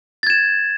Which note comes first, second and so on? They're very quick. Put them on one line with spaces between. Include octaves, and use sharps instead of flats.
A6 G#6 E7